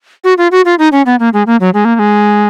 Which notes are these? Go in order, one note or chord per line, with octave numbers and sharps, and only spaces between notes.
F#4
F4
F#4
F4
D#4
C#4
B3
A#3
G#3
A#3
F#3
G#3
A#3
A#3
G#3